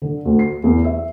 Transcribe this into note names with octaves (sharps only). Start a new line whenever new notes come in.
D3
D2
C7
E2
E5